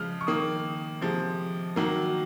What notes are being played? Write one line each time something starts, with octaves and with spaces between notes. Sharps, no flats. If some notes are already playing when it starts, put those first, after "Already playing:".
Already playing: C#3 F3 G#3 F6
C#6
D#3 A#3 D#6
C3 F3 G#3
D#3 F#3 A#3